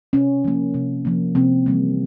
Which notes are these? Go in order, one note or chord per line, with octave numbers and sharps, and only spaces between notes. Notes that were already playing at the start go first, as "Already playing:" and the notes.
C3 C#4
F3 A#3
C3
F3 A#3
C3 C4
E3 G3 A#3